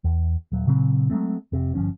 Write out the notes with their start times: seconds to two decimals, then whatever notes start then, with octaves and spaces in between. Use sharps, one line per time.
0.04 E2
0.52 D#1 F#3
0.67 A#2 C#3 F#3 C4
1.10 F#3 G#3 A3 C4
1.52 F1 C3
1.75 G1 E2 F3 C#4